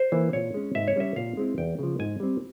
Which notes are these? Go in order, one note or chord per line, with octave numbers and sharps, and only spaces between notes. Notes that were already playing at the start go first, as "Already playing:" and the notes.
Already playing: C5
E3 A#3 E4
A#2 C#5
G#3 C#4
G#2 E5
C#5
G3 C#4 E5
A#2 F5
G#3 C4 E4
E2 G5
C#3 F3
G#2 G#5
G3 C4